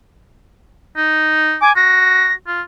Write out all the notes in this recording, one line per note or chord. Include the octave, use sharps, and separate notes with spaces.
D#4
G#5 D6
F#4 A#6
F4